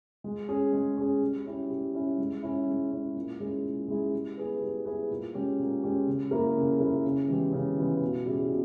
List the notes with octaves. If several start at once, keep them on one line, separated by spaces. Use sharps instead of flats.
G#3
C#4 G#4
G#3
C#4 G#4
G3
C#4 E4 G4
G3
C#4 E4 G4
G#3
C#4 E4
G#3
C#4 E4
A#2
G#3 C#4 E4 G#4
A#2
G#3 C#4 E4 G#4
G3
B3 E4 G#4 B4
G3
B3 E4 G#4 B4
A#2
G#3 C#4 G4
A#2
G#3 C#4 G4
C#3
G3 A#3 E4 A#4
C#3
G3 A#3 E4 A#4
C#3
E3 G#3 B3 G4
C#3
E3 G#3 B3 G4
B2
G3 C#4 E4 G#4
B2